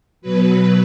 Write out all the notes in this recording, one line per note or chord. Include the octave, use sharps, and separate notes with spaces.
B2 F#3 B4